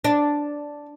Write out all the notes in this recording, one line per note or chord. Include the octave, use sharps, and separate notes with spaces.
D4